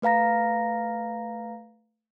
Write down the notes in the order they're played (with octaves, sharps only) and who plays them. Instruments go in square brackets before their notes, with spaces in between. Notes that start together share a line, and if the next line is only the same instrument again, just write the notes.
[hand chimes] A3 B4 F5 A#5 A#6